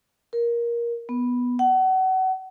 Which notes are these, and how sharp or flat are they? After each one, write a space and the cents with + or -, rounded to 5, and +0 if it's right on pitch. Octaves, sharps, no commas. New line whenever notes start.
A#4 +15
B3 -5
F#5 +30